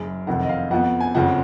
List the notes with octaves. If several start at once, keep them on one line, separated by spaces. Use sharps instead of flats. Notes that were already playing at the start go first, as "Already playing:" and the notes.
Already playing: F#1 F#2 C#3
F1 F2 D#3 F#5
D#5
F5
F2 F3 B3 F#5
G#5
F#1 F2 C#3 F3 F#5